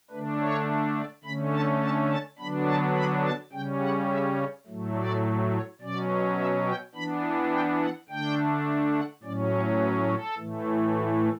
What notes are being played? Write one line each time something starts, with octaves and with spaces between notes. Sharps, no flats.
D3 A3 D4 B4
C#5
D5
D3 A3 C#4 B5
A5
A5
A5
D3 F#3 B3 D4 B5
A5
B5
A5
C#3 G3 C#4 G5
F#5
E5
A2 F#3 A3
D5
C#5
B2 F#3 C#4 D5
E5
G5
E3 B3 D4 B5
G5
F#5
D3 A3 D4 G5
F#5
A2 F#3 C#4 D5
C#5
B4
A4
A2 E3 A3
F#4